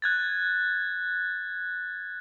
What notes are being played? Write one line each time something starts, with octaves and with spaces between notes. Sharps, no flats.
F#6 G#6 A6